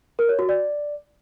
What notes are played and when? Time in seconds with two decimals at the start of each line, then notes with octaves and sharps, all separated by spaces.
0.19 A#4
0.29 C#5
0.39 F#4
0.49 D5